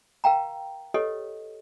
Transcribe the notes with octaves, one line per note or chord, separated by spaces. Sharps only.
A#4 F5 G5 A#5
G4 A4 B4 C#5 D#5